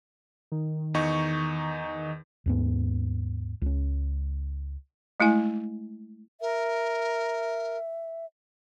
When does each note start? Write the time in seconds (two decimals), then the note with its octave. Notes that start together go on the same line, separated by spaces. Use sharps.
0.52 D#3
0.94 E2 D#4 C#6
2.46 D#2 G#2 B3
3.62 C#2 C#4
5.20 G#3 A3 E4 G#5
6.41 A#4 E5